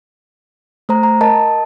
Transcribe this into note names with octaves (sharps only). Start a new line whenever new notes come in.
A3 C5 A#5
A#5
A#4 D#5 A5